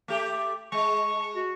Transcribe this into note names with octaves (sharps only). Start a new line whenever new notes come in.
A3 G4
G#3 C#6
F#4